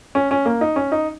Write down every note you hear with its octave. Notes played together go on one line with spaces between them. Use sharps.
C#4
C#4
A#3
D#4
C#4
D#4